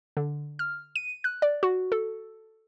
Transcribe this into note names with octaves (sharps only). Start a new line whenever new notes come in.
D3
F6
D#7
F#6
D5
F#4
A4